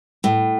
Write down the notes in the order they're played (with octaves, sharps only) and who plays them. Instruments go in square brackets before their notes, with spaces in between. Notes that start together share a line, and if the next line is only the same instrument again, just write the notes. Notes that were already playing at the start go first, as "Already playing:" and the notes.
[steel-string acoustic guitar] A2